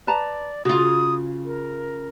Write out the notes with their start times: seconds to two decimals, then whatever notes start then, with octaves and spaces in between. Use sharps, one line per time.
0.07 B4 D5 A5 A#5
0.65 C#3 F4 F#4 D#6
1.45 A#4